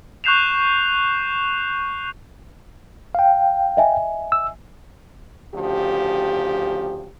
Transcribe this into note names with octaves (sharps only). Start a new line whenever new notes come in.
C#6 F#6 G6 C7 E7 F7
F5 G5
D#5 E5 G#5
E6
D2 C#3 F3 G4